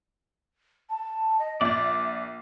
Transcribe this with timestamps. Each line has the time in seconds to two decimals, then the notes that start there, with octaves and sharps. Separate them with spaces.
0.90 A5
1.39 D#5
1.61 A#1 D5 E5 A6